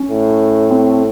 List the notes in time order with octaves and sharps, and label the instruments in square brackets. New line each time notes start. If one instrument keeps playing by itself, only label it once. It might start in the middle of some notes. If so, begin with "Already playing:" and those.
Already playing: [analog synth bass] C#4
[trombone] A2
[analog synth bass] C4